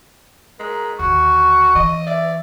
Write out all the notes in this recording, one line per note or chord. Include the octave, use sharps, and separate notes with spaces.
G#3 A#4
D#2 D3 F#4 C#6
E3 D#5
D5 E5